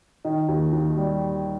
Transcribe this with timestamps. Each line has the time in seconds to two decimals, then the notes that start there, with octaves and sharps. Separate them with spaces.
0.25 D#3 D#5
0.48 D#2
0.73 D#2
0.97 G3